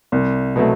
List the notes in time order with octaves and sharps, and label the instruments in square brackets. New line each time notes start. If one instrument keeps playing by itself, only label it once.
[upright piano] C2
B2 F#3 A3